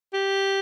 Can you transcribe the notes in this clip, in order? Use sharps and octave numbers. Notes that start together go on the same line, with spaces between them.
G4